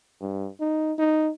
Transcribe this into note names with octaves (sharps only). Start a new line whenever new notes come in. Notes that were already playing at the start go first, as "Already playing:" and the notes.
G2
D#4
D#4